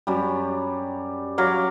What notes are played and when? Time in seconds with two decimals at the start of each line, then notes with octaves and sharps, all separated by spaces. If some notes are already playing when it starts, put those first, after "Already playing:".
0.07 F#2 G3
1.38 F#3 F5 D6